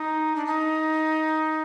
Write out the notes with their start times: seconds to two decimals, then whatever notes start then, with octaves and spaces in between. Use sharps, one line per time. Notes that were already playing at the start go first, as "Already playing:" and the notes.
Already playing: D#4
0.36 D4
0.46 D#4